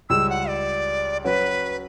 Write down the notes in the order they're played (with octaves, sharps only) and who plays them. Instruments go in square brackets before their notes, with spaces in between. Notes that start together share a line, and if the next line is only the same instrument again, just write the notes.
[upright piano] C#2 C#3 G3 [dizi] E6
[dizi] F#5
D5
[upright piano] F#3 C#4 F#4 [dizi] B4